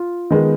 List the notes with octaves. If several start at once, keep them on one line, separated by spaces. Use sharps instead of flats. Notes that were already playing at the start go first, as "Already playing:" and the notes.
Already playing: F4
D#3 G#3 B3